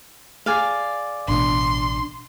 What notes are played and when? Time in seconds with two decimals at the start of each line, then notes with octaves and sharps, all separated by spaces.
0.46 G#4 D5 F5
1.28 A1 B2 A3 D4 C6